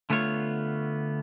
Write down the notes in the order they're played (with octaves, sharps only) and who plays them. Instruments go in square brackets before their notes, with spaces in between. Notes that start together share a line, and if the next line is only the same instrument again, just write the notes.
[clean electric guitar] D3 A3 B3 F4 C#5